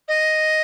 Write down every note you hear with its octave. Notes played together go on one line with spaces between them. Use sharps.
D#5